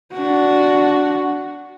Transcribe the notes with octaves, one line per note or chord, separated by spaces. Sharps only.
D4 F#4